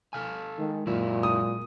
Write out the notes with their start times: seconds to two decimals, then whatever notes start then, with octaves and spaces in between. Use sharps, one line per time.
0.13 A4 F5 G#5
0.58 D#3 G#3
0.87 F#2 A#2 F#3 E4
1.23 D#6